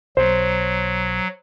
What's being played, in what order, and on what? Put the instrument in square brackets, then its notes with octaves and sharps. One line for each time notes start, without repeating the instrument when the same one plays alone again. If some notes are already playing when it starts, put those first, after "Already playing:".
[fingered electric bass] B1 [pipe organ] F#3 [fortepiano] C5